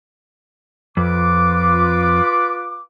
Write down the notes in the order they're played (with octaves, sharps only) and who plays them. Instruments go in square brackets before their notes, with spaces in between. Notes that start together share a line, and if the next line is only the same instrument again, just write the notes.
[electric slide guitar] F2 [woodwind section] F4 B4 D6